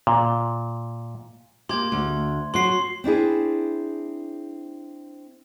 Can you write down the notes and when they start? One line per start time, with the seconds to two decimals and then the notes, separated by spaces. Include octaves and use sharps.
0.07 A#2
1.69 A#3 G4 C6 G#6
1.92 D2
2.54 F#3 F#4 C6 C7
3.04 C4 D4 E4 G#4